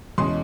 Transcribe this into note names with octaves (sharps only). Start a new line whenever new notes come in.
E2 B2 G#3 C#4 C6